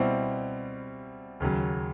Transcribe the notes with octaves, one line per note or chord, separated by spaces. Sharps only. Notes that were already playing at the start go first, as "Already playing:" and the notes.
Already playing: B2 G3 C4 E4
D#2 C#3 F#3